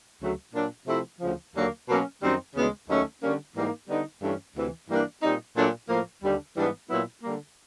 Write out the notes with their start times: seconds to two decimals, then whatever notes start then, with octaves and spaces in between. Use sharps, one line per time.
0.20 D2 C#3 F#3 A3
0.53 A#2 F#3 A#3 D4
0.87 C3 F3 A3 C4 E4
1.20 D2 C#3 F3
1.54 D#2 D3 F#3 A#3
1.87 B2 F#3 A#3 C#4
2.21 F#2 D#3 G3 C4 D#4
2.55 D2 C#3 E3 G#3 B3
2.88 D#2 D#3 F#3 A3 C#4
3.21 D3 G3 A#3 C#4
3.55 G#2 E3 G3 A#3 D#4
3.88 D3 G3 B3 D#4
4.21 G2 E3 A3 C#4
4.55 D2 C3 E3
4.88 G2 E3 G3 A#3 D4
5.22 A#2 G3 C4 D#4
5.56 A#2 F#3 A3 D4
5.88 A2 F3 A#3
6.23 D#2 D3 G3
6.56 G#2 E3 G3 B3 D4
6.89 A#2 F#3 B3 E4
7.22 D3 G3 A#3